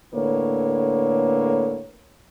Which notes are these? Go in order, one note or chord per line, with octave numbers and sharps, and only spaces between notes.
A2 D3 A#3 B4 C#5